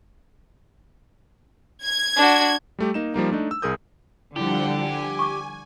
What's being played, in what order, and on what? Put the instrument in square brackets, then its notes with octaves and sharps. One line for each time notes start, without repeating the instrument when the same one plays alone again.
[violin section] G#6
[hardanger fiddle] D4 F#4
[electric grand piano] G3 A3 G4
A#3 D#4 E7
F3 G3 A#3 D#4
A3 D4 D#4
E6
C2 G#4 A#4 D#6 G6
[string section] D3 [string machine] F3 G3 F#5 [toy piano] E4 [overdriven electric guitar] G4
[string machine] G#5
[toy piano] C#6 D6